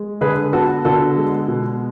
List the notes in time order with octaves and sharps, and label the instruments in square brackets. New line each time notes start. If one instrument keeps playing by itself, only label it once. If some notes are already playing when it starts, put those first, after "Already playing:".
Already playing: [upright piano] G#3
D3 G#4 B4
B3 F#4 A4
D3 F#4 A4
G#3
B2